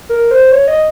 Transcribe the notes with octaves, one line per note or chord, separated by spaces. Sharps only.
A#4
C5
C#5
D#5